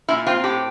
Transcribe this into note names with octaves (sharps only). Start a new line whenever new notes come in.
A#2 E4
C4 F4
A2 G4